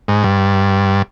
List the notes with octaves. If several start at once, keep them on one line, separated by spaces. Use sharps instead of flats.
G#2
G2